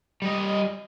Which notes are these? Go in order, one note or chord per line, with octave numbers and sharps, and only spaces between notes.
G3 D#5